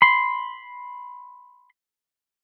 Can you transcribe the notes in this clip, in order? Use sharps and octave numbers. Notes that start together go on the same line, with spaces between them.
B5 C6